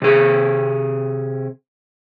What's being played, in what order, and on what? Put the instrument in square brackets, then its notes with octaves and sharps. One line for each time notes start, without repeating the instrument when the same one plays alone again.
[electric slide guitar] C3 G#4